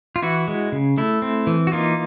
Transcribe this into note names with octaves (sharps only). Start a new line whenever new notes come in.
F4
E3 E4 F#4
G#3
C#3
A3 E4
C4
E3
F#4
A#3 D#4 F4